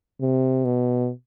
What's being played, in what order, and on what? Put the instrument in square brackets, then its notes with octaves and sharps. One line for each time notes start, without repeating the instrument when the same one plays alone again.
[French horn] C3
B2